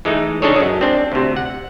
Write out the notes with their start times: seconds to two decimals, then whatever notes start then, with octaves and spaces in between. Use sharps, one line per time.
0.05 E3 G#3 A3 D#4
0.42 C#3 D4 D#4 G#4 A4 C#5
0.56 F#2 G#3
0.81 C4 D4
1.12 D2 C3
1.36 F#5